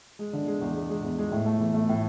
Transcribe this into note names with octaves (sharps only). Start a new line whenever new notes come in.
G#3
D3
G#3
E2
G#3
G#3
E2
G#3
A2
A3
E3
A3
A2